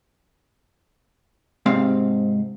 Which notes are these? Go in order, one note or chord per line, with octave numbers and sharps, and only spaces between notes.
G#2 C3 C4 F5